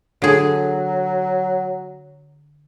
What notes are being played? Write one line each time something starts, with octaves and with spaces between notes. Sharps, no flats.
D3 F#3 G#4